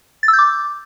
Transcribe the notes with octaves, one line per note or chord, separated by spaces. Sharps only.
A6
E6
G6
D6